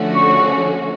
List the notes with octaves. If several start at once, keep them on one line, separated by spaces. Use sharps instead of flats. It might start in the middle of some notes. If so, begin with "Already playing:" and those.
Already playing: D3 F3 A3 C#4 F#4
C#6